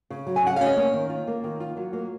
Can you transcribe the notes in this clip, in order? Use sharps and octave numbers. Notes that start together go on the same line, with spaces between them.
C#3
F#3
G#5
C#3 F#5
C#4 F5
D#5
A#3 C#5
D#3
F4
A#3
D#3
F4
F#3
A#3